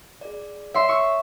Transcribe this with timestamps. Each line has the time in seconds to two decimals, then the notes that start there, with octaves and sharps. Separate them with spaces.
0.21 G#4 D5
0.74 C#5 E5 C6
0.89 C#6 E6